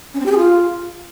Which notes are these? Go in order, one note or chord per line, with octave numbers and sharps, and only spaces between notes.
C#4
C4
G4
G#4
F4